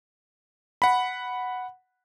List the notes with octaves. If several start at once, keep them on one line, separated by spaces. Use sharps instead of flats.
F#5 B5